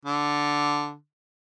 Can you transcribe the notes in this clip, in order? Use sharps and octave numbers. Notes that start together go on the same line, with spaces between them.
D3